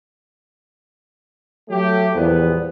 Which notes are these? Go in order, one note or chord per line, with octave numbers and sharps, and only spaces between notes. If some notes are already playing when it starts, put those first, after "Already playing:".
F#3 A3 G4
E2 A#2 F3 G3 B3 B4